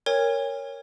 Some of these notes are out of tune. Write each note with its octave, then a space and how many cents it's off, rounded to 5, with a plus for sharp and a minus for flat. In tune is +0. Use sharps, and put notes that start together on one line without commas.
A#4 -5 C#5 +0 G#5 -45